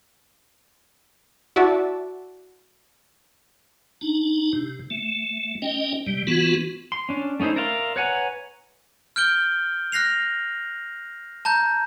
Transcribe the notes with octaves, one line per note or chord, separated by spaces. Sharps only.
E4 F#4 D5 E5 A5
D4 D#4
C3
A3
C#4 D#5 G5
C3 G3
E3 B3 F4 F#4
C6
C#4 D4
A3 C#4 D#4 E4 C5
A#4 D5 E5 F5 C6
B4 C#5 F#5 G#5 A#5
F6 G6 D7 G7
F6 F#6 A#6 C7 F7
A5 A#5 G6